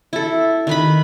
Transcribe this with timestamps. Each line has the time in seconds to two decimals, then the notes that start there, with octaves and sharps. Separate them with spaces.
0.13 E4 A4
0.67 D#3 B4 B5